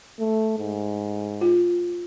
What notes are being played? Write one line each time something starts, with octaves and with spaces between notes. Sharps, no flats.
A3
G#2
F4